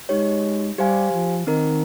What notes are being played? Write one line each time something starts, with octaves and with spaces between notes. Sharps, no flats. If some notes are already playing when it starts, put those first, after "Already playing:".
G#3 D#4 G4 C#5
G3 G4 C5 F5 G#5
F3
D#3 C4 D#4 A#4